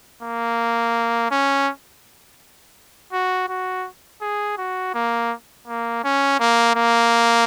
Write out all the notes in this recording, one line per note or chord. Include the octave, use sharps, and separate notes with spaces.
A#3
C#4
F#4
F#4
G#4
F#4
A#3
A#3
C#4
A#3
A#3